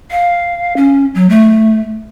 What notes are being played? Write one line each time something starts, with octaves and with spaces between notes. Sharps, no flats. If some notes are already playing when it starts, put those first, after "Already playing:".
F5
C#4
F#3
A3